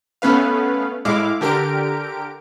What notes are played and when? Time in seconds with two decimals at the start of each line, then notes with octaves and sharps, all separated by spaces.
0.22 A3 B3 C#4 B4 F5
1.05 A2 G#3 E4 F5 D6
1.41 D3 G4 A#4 D7